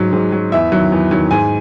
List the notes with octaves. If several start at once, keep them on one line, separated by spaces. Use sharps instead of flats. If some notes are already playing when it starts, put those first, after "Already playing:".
Already playing: G#2 F#3
G#2
F#3
E2 E5
D#3 F#3
E2
D#3 F#3
G#2 G#5